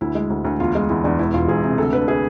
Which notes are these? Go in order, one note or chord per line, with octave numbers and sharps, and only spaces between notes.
D2 E4
G#3
D2
D2
E2 F4
G#3 F4
E2 E4
E2 D4
E1 E4
E1 F4
E1 G#4
C3
D2 A4
D3 B4
G#4